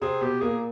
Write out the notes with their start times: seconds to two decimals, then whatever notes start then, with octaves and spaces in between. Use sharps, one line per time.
0.01 C3 C4 G#4
0.21 B2 B3 G4
0.41 A#2 A#3 G#4